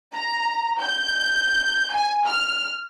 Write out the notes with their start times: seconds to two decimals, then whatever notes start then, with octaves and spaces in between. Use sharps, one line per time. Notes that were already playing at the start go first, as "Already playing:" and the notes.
0.16 A#5
0.82 G6
1.94 G#5
2.27 F6